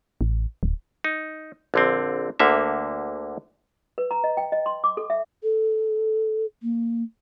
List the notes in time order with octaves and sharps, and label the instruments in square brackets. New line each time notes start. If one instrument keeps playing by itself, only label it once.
[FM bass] A1
D1
[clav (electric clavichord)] D#4
A#1 D3 C4
D2 D3 A#3 E5
[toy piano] B4
A#5
D#5
G5
D#5
C6
D6
A4
E5
[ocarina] A4
A#3